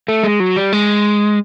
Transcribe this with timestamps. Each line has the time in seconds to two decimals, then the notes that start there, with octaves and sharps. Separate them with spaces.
0.08 A3
0.24 G#3
0.40 F#3
0.56 G3
0.73 G#3